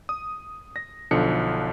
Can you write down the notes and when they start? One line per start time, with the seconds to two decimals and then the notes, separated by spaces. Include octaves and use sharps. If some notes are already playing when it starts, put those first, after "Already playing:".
0.09 D#6
0.76 A#6
1.11 B1 D3 F3 C#7